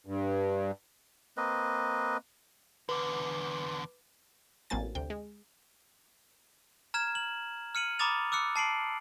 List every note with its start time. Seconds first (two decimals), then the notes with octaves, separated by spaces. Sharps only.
0.06 G2
1.37 A#3 C4 B4 D#5
2.89 E2 D3 B4 D6
4.70 A1 F#3 A#3 C4 G#5 A6
4.95 D2 C3 G5
5.10 G#3
6.94 A#5 F6 G#6 E7
7.15 F#7
7.75 F6 C#7 D#7 F#7
7.99 A#5 B5 D6 D#6 A6 F7
8.32 D6 E6 F#6 C#7
8.56 A5 C7 D7 F#7